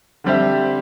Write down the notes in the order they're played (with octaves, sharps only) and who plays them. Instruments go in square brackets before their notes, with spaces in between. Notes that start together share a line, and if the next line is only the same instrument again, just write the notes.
[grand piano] D3 G3 C4 G4 E5